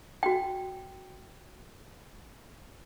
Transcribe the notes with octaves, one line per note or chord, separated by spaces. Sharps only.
F#4 G5